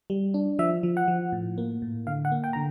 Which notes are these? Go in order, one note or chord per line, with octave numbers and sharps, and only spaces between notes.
G3
D4
F3 E5
F3
F#5
F3
A2
A#3
A2
D3 F5
F#5
A#3
G5
D3 A#5